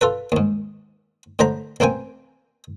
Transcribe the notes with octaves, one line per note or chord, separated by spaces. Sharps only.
F4 A4 B4
D#2 G#2
A2 D3 C5 A#5 B5
A1 A#3 C4 G5 G#5